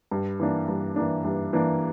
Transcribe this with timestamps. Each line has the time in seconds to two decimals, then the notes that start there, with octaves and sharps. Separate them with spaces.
0.11 G2
0.40 E3 A#3 D4
0.68 G2
0.96 E3 A#3 D4
1.25 G2
1.53 E3 A#3 D4